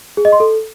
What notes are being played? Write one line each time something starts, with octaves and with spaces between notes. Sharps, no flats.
G#4
D#5
C6
A4